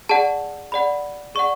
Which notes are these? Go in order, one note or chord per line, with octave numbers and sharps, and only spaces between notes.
G#4 D5 F#5 A5
G#4 D5 F#5 B5
G#4 D5 F#5 C#6